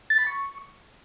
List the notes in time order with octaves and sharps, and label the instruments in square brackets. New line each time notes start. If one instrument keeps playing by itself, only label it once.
[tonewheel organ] A6
B5
C#6